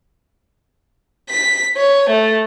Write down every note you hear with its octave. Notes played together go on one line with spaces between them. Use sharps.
B6
C#5
A3